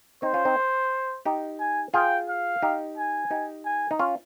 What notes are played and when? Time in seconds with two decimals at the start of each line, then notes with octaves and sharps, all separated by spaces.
0.22 C4 D#4 C5
0.34 C#4 F4
0.45 C4 D#4
1.26 D#4 G4
1.60 G#5
1.94 F4 G#4 G5
2.29 F5
2.62 D#4 G4
2.97 G#5
3.31 D#4 G4
3.65 G#5
3.91 D#4
3.99 C#4 F4